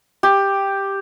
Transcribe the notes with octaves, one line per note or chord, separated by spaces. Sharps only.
G4